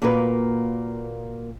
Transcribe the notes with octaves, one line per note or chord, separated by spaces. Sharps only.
A#2 A#3 F#4 A#4 B4